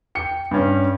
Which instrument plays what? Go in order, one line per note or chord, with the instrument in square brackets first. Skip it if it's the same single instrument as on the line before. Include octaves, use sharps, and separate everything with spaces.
[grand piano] G5 C#7
G2 C#4